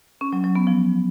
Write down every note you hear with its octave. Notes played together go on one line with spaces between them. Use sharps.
C#4
F#3
F#3
B3
F3